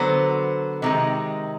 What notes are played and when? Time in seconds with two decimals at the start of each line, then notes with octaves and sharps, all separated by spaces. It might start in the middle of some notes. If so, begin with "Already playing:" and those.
Already playing: D3 F#3 B3 C5
0.82 C3 D#3 G#3